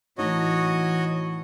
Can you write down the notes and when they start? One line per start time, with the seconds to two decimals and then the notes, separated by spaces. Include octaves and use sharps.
0.18 A2 E3 D#4 F#4 C#5 D#5